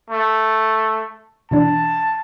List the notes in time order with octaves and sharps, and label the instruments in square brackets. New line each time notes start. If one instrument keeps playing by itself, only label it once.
[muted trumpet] A3
[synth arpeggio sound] B2 E3 D4 [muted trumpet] A5